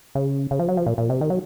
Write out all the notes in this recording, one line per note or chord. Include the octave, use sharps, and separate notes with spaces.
C#3
C#3
F3
F#3
F3
A#2
A#2
C3
D#3
F#3